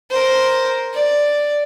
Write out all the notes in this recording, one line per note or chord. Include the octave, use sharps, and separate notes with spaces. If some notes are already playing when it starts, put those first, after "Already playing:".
A#4 C5
D5